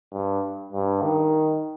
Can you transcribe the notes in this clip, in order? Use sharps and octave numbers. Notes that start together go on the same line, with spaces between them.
G2
G2
D#3